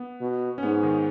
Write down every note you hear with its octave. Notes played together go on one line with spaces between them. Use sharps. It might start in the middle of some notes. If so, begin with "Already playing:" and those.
Already playing: B3
B2
C#4
G#2 B3
D#3 D#4